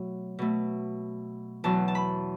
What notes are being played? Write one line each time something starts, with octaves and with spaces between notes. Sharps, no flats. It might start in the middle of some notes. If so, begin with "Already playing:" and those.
Already playing: B2 F#3 A3
B2 A3
E2 B2 F#3 A5
A5
B5